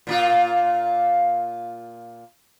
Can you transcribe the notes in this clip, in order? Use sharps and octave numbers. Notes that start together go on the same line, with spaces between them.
A#2 A#3 F4